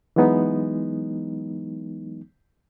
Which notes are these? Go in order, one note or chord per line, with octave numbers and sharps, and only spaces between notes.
E3 F#3 G#3 B3 D#4